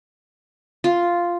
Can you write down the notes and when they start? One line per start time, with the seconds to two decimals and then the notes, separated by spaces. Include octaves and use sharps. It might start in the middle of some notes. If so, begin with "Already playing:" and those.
0.84 F4